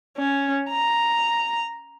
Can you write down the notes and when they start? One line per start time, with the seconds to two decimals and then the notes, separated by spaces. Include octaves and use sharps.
0.17 C#4
0.70 A#5